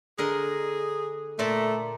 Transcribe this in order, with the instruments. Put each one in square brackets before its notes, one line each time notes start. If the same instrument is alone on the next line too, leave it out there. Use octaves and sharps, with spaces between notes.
[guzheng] D3 A#4 D#5 [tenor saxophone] G#4
[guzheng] A#2 D5 E5 [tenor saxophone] A3